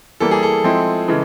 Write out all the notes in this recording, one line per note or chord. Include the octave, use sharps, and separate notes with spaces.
E3 G3 A#3 A4
G#4
A4
F3 G#3 C4 E4
C#3 E3 G#3